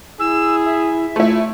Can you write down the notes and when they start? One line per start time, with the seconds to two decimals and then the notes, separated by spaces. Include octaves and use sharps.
0.19 E4 G#4 E6
0.65 E5
1.16 A3 E4 F4